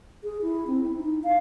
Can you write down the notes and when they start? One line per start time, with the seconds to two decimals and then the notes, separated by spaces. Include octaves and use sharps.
0.23 G#4
0.42 E4
0.67 C4
0.80 E4
0.97 D#4
1.24 F5